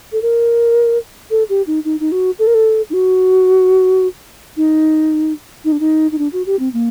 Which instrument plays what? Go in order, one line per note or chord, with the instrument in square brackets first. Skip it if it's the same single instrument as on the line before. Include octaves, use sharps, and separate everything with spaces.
[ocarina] A4
A#4
A4
G4
D#4
D#4
D#4
F#4
A4
A#4
A4
D#4
F#4
D#4
D#4
D4
D#4
D#4
D4
F#4
G4
C4
A#3